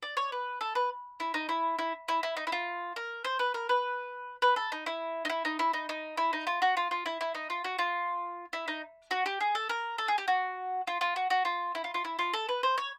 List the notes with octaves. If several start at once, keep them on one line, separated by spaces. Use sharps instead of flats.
D5
C#5
B4
A4
B4
E4
D#4
E4
E4
E4
E4
D#4
E4
F4
A#4
C5
B4
A#4
B4
B4
A4
D#4
E4
D#4
E4
D#4
E4
D#4
D#4
E4
D#4
F4
F#4
F4
F4
E4
E4
D#4
F4
F#4
F4
E4
D#4
F#4
G4
G#4
A4
A#4
A4
G#4
G4
F#4
F4
F4
F#4
F#4
F4
E4
F4
F4
E4
F4
A4
B4
C5
C#5